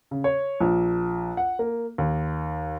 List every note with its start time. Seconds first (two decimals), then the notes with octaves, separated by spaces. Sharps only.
0.11 C#3
0.24 C#5
0.61 A#1
1.37 F#5
1.59 A#3
1.98 D#2